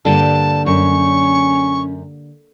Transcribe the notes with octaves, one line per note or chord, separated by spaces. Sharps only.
G2 D3 A#3 G4 A5
F#2 C#4 C#6